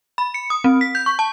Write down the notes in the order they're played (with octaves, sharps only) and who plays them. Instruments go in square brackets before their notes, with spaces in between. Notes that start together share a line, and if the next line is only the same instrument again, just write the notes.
[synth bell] B5
C#7
D#6
C4
B6
G6
C#6
A5